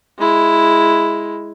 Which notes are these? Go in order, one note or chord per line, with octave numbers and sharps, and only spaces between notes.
G#3 E4